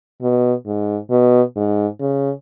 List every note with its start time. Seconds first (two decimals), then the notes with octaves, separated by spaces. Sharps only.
0.22 B2
0.66 G#2
1.10 B2
1.56 G#2
2.00 C#3